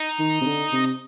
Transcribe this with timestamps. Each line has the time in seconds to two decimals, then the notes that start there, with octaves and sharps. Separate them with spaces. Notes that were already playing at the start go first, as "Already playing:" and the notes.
Already playing: D#4
0.19 D#3
0.41 C3
0.46 D3
0.73 C3